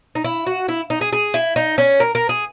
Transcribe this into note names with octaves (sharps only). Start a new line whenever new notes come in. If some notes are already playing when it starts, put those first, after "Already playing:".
D#4
E4
F#4
E4
D#4
G#4
G#4
E4
D#4
C#4
A#4
A#4
G#4